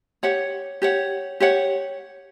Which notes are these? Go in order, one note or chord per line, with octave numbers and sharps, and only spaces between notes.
G4 C#5 F#5
G4 C#5 F#5
G4 C#5 F#5